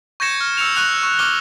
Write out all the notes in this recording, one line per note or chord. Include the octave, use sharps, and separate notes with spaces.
C#6 G6 G#6 A#6 C#7 E7
F6
E6 C#7 F7
C#6 F#6 F7
C#6
C#6 D6 F6 G7